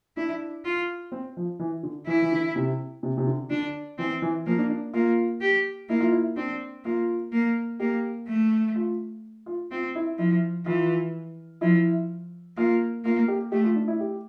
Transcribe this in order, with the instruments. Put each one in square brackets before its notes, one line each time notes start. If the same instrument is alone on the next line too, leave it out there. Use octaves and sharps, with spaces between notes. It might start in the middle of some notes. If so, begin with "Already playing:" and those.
[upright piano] D4 [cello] E4
[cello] F4
[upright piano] C4
F3
E3
D3
[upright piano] E3 [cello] E4
[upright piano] E3
D3
C3
C3
C3
D3
[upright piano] D3 [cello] D4
[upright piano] E3 [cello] C4
[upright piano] E3
[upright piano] F3 [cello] A#3
[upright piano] D4
D4
[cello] A#3 [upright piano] F4
[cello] G4
[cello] A#3 [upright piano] E4
[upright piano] F4
E4
[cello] C4 [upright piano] D4
[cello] A#3 [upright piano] F4
[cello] A#3
[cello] A#3 [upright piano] G4
[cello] A3
[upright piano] F4
F4
[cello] C4 [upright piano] F4
[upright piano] E4
[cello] F3 [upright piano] E4
[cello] E3 [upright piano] F4
[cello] F3 [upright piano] E4
[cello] A#3 [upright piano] F4
[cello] A#3 [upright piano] F4
[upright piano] G4
[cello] A3 [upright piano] G4
[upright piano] F4
D4
E4
G4